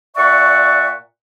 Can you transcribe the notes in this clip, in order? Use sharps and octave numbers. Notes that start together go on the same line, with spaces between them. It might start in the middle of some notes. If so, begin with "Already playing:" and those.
A#2 D5 E5 F#5 C#6